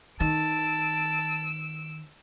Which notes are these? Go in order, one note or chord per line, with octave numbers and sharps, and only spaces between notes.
D#3 A5 E6 D7